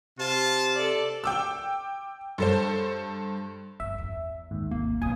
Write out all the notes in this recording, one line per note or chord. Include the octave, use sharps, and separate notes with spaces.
C3 F4 A5
A4 D5
G5 D6 E6
G2 A4 C5
G1 E5
E2
G#1 D#2 G#2
C2 A#3
B1 G#5 D#6